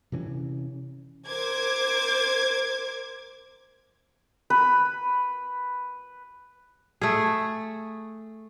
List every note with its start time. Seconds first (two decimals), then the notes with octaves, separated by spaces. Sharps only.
0.12 C3 E3 C4 C#4
1.26 A#4 C5 D6 G#6
4.50 B4 B5
7.01 A3 G#4